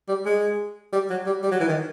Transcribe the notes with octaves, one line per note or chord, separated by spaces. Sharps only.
G3
G#3
G3
F#3
G3
G3
F#3
E3
D#3